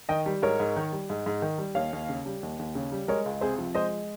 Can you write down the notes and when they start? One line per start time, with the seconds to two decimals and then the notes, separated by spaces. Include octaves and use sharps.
0.09 D#3 D#5 G5
0.26 G3
0.42 G#2 A#4 C#5
0.60 G#2
0.76 D#3
0.92 G3
1.10 G#2
1.26 G#2
1.42 D#3
1.58 G3
1.75 D#2 C#5 F5
1.93 D#2
2.09 C#3
2.26 G3
2.43 D#2
2.59 D#2
2.75 C#3
2.92 G3
3.08 G#3 A#4 C#5
3.26 C#2
3.41 C3 G#4 C5
3.58 F3
3.75 G#3 C5 D#5